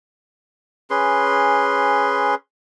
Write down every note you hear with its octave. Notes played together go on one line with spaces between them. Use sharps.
C#4 G#4 B4 C6